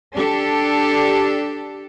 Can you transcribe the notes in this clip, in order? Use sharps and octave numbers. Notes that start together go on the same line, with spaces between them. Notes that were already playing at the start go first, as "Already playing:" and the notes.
D4 G4 A4